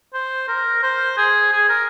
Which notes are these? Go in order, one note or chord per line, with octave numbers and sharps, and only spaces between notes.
C5
A#4
C5
G#4
G#4
A#4